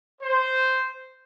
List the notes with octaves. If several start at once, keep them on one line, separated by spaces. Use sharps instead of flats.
C5